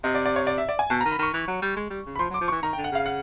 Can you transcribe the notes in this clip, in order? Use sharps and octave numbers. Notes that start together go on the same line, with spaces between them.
C3 D#5
D5
D5
C#5
D5
E5
D5
G#5
B2 A5
D#3 A#5
B5
D#3 C#6
E3
F#3
G3
G#3
G3
C#3
B5
F3 C6
F#3
D6
F3
E3 C#6
D#3 A#5
D3 G5
F#5
C#3 F5
F#5